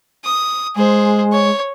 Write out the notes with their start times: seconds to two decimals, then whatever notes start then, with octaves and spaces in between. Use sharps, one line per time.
0.24 D#6
0.76 G#3 G#4 C5
1.33 C#5